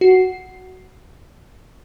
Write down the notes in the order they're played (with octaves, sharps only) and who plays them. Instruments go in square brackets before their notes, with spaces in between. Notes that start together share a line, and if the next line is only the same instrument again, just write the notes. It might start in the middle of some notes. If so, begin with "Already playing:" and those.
[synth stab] F#4 C7